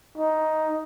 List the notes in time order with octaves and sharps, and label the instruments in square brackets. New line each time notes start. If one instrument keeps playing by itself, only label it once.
[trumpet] D#4